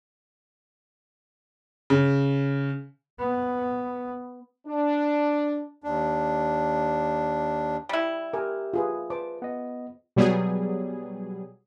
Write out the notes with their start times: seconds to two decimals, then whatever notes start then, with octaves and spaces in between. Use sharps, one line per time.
1.90 C#3
3.19 B3
4.67 D4
5.84 D#2 D4
7.89 G3 E4
8.33 G4 A#4 G#5
8.74 F4 G#4 B4
9.10 B4 C5 A5 D6
9.42 B3 D#5
10.16 B2 F#3 G3 B3 G#4